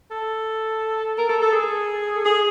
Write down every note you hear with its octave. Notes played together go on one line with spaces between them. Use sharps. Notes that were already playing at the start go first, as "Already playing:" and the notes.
A4
A#4
A4
A4
G#4
A4
G#4